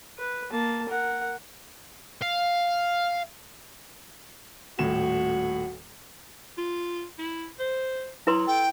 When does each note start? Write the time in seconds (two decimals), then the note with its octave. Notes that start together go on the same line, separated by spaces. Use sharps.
0.18 B4
0.51 A#3 A5
0.89 A#4 F#5
2.22 F5
4.79 D#1 A2 F#4 E7
6.57 F4
7.19 E4
7.59 C5
8.27 F#3 E4 B4 C6
8.47 A4 G5